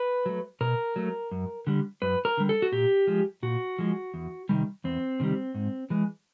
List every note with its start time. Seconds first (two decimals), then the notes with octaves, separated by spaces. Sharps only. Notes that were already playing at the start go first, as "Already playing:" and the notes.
Already playing: B4
0.26 F#3 A3
0.61 B2 A#4
0.96 F#3 A3
1.31 F#2
1.67 D3 G3
2.02 F#2 B4
2.25 A#4
2.37 D3 G3
2.49 A4
2.62 F#4
2.72 A#2 G4
3.07 F3 G#3
3.43 A#2 F#4
3.79 F3 G#3
4.14 E2
4.49 C3 D#3 G3
4.84 E2 C4
5.20 C3 D#3 G3
5.55 G#2
5.90 E3 G#3